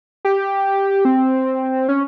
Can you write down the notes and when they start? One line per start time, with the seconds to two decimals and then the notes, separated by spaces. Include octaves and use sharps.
0.25 G4
1.05 C4
1.89 C#4